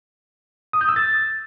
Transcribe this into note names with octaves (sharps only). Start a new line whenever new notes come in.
D#6
G6
E6
A6